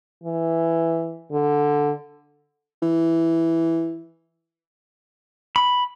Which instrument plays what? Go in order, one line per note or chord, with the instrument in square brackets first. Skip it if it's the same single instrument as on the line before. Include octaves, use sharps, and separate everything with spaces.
[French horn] E3
D3
[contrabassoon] E3
[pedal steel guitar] B5